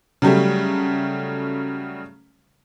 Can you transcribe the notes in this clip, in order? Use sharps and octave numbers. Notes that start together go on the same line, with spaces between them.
C#3 F#3 G3 A3